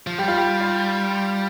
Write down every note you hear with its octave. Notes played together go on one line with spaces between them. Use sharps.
F3
G3 G4
F4
G4
F4